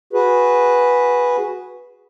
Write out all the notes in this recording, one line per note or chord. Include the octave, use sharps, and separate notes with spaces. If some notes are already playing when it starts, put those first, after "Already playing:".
F#4 G#4 B4